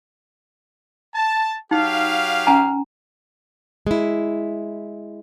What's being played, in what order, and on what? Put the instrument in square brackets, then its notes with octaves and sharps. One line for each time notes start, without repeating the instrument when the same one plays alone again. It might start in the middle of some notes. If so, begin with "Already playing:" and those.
[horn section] A5
[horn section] F#3 G4 F5 [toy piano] D#4
[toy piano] C#4 G#5 A#5
[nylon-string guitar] G#3 E4